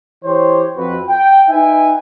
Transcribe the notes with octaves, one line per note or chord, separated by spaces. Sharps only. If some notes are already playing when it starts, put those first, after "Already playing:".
E3 G4 C5 C#5
F2 C4 F#4 B4
G5
D#4 B4 E5 G5 G#5